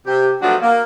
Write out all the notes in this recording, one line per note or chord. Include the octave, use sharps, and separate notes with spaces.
C3 G4
F3 F#3 A3 B3 D4 F#4
A#3